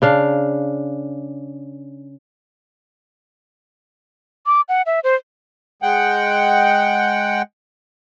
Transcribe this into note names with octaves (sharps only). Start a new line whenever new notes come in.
C#3 D4 F5
D6
F#5
E5
C5
G#3 F#5 G5